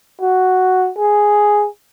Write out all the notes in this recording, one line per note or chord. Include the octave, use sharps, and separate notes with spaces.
F#4
G#4